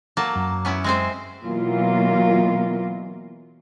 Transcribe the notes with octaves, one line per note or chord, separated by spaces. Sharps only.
F#3 A#3 A5
F#2
B3 C#4 E4
G#3 C4 C5
B2 E3 F#3 A#3 F4 A#4